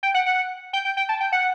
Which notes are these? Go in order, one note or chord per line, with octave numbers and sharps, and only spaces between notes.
G5
F#5
F#5
G5
G5
G5
A5
G5
F#5